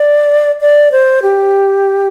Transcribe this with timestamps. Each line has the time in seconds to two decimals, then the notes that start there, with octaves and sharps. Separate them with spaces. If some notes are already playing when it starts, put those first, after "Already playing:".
Already playing: D5
0.61 D5
0.92 C5
1.22 G4